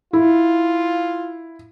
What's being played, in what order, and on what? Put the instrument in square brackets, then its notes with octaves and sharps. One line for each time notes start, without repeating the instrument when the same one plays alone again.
[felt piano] E4 [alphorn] F4